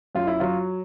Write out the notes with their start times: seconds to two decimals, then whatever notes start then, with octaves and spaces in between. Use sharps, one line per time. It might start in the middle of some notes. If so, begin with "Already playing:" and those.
0.15 F#2 F4
0.27 E4
0.40 F#3 F4